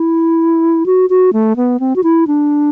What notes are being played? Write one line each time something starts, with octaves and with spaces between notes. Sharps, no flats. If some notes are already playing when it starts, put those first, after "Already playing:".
Already playing: E4
F#4
F#4
A3
B3
C4
F#4
E4
D4